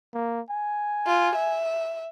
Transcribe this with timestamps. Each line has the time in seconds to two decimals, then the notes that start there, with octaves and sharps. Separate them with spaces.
0.14 A#3
0.51 G#5
1.07 F4
1.35 E5